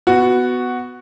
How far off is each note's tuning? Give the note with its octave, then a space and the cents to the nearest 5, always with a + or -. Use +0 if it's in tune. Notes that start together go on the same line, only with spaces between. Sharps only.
B3 +15 F#4 +0